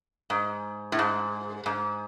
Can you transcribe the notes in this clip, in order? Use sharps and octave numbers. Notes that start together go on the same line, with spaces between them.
G#2
A2
G#2
G#2